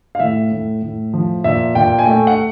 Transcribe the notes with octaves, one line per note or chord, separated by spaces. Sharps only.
F5
A2 E5
A2
A2
F3
A#2 E5
A#2 G5
G#5
A3 G5
F#5